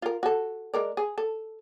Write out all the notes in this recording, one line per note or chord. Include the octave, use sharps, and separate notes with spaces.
F4 A#4
F#4 A4
G#3 A#4 D5
G#4
A4